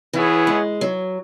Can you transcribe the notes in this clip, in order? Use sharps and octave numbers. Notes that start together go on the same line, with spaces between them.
E3 B3 E4 G#4 C#5
G#3
F#3